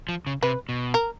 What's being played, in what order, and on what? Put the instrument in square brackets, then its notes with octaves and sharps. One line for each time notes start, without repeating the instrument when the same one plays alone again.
[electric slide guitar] F3
C#3
[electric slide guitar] C3 [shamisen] B4
[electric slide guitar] B2
[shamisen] A#4